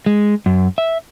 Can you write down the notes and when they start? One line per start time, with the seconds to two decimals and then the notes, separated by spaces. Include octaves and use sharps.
0.06 G#3
0.46 F#2
0.78 E5